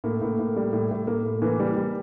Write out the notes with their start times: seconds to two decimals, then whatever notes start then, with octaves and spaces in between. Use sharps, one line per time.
0.04 A2 A#3
0.21 A2 A#3
0.39 A2
0.56 G3
0.73 A2
0.91 A2
1.07 A2 A#3
1.25 A2
1.42 E3 A#3
1.60 G3
1.77 G3